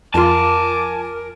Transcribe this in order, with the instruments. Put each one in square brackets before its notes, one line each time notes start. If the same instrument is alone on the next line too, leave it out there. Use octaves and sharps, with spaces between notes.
[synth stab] F2 F4 [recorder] A#4 [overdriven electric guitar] G#5 A5 [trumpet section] D6